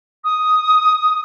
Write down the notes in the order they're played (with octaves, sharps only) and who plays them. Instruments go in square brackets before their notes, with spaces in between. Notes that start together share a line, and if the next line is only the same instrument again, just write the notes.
[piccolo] D#6